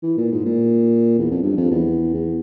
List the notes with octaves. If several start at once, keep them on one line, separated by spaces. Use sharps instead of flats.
E3
A#2
G#2
A#2
E2
F2
G2
F2
E2
E2